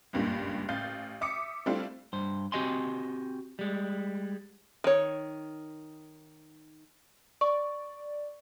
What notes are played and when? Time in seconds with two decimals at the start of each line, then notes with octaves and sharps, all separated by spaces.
0.13 F#1 C#2 G2 A#2
0.69 A1 F5 G6 A6
1.21 E5 D6 D#6 C#7
1.66 G3 A3 C4 D4 E4 F4
2.13 G2 C5
2.52 C4 F#4 G4 D#5 G#5 C6
3.59 G3 G#3
4.84 D#3 C#5
7.41 D5 C#6